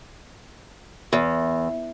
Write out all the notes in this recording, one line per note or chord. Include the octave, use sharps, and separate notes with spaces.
E2